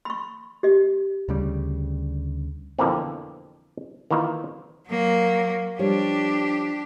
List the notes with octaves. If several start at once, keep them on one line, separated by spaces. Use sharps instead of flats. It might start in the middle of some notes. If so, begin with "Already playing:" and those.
B5 C#6
G4 D#5
D2 C#3 G3
F2 B2 D3 E3 A#3 C4
D#3 E3 A#3 D#4 F4
F#3 A#3
F3 G3 D4 G4 C#5